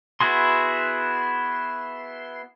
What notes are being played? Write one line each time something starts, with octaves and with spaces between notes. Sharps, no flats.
B3 E4 F#4 G#4 C6